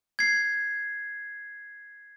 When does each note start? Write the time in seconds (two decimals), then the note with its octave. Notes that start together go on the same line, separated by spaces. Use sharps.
0.19 G#6 C7